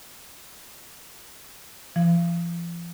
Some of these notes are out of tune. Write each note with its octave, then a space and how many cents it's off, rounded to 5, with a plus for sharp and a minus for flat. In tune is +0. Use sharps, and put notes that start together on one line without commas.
F3 -40